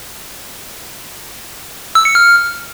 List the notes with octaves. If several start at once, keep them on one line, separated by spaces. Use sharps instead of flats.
E6
C#7
F6